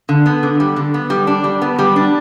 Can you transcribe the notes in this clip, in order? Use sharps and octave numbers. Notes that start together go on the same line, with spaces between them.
D3
B3
D3
G3
D3
B3
G3
D4
G3
B3
G3
D4